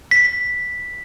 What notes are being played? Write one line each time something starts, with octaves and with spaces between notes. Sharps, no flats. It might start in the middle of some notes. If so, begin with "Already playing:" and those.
B6